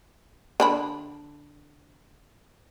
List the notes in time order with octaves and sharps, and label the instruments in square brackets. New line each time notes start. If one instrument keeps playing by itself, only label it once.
[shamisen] D3 D4 B5